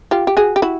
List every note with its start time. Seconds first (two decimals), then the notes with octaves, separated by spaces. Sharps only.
0.11 F4 G4
0.27 G4
0.37 F#4 G#4
0.56 G4
0.62 E4 F#4